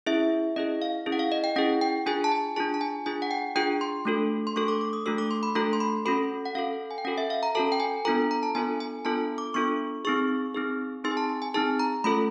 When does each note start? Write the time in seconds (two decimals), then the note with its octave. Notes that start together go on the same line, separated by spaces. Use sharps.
0.06 C#4 E4 G#4 E5
0.56 C#4 E4 G#4 D#5
0.82 F5
1.06 C#4 E4 G#4
1.12 F#5
1.19 F5
1.32 D#5
1.44 G5
1.56 C#4 E4 G#4 F#5
1.81 G5
2.06 D4 F4 G#4 G#5
2.24 A5
2.32 G#5
2.56 D4 F4 G#4 A5
2.74 A5
2.81 G#5
3.06 D4 F4 G#4 G#5
3.22 F#5
3.31 G5
3.56 D4 F4 G#4 G5
3.81 C6
4.05 A3 D4 F#4 A4
4.47 C6
4.56 A3 D4 F#4 A4 C#6
4.68 D6
4.81 D6
4.93 D#6
5.06 A3 D4 F#4 A4 E6
5.18 D6
5.31 C6
5.43 B5
5.55 A3 D4 F#4 A4 A#5
5.73 C6
5.80 B5
6.06 C#4 F#4 A4 B5
6.46 F#5
6.55 C#4 F#4 A4 F5
6.91 G#5
6.98 G5
7.05 C#4 F#4 A4 F#5
7.18 E5
7.30 F5
7.43 A#5
7.55 C#4 F#4 A4 A5
7.72 G5
7.80 G#5
8.05 B3 D4 F4 A4 A#5
8.31 A#5
8.43 A5
8.55 B3 D4 F4 A4 G#5
8.80 G#5
9.05 B3 D4 F4 A4 A5
9.38 D6
9.54 B3 D4 F4 A4 C#6
10.05 C4 D#4 G#4 C#6
10.54 C4 D#4 G#4
11.04 C4 D#4 G#4 C6
11.11 G#5
11.17 A5
11.42 G#5
11.54 C4 D#4 G#4 A5
11.79 A#5
12.04 A3 C#4 F4 A4 B5